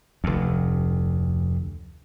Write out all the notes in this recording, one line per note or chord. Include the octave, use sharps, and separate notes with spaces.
F1 D2